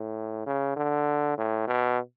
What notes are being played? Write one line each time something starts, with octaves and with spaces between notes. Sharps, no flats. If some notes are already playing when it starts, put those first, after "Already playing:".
Already playing: A2
C#3
D3
A2
B2